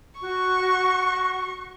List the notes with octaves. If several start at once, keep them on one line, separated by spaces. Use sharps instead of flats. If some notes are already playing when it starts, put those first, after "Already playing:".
F#4 C#6